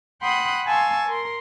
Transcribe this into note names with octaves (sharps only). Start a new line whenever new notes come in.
F#5 G5 B5 C6 D#6 F#6
F5 G#5 A5 C6 C#6 E6
A#4 C6